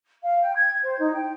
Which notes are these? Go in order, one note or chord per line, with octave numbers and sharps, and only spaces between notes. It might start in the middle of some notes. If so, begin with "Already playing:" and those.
F5
G5
G#6
C5
D#4
G5